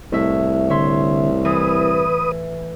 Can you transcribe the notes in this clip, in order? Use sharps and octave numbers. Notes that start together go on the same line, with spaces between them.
C2 A2 E5
D3 C#5 E5 C6
E3 B4 D#6